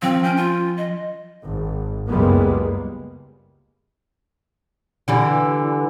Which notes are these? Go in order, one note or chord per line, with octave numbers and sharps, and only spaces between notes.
F3 C4
C#4 G6 D7
F4
D#5
G#1
F#1 C#2 G3 G#3 A#3 B3
D3 E3 G3